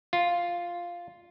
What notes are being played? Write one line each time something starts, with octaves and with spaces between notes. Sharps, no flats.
F4